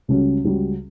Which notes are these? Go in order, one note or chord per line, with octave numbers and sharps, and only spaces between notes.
C#2 C#3 G3 C#4 F#4
C#2 C#3 G3 C#4 F#4